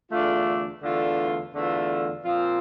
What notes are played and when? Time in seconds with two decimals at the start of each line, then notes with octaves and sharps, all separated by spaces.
0.09 E2 D3 A3 D4 F4
0.81 E2 D3 A3 D4 F4
1.53 E2 D3 A3 D4 F4
2.24 A#2 F3 C4 F4